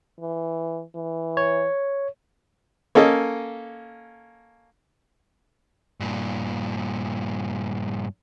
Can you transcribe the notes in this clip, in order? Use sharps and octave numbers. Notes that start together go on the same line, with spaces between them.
E3
E3
C#5
A#3 C#4 A4 D#5
G2 A#2